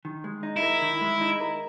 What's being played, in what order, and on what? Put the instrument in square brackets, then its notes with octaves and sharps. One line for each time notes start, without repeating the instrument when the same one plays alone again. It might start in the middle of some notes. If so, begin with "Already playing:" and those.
[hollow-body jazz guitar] D#3
G#3
D#4
[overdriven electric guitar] E4
[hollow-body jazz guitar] A#4
D#3
G#3
D#4
A#4